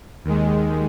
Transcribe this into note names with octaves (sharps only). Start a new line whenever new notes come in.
D#2 D#3 G#3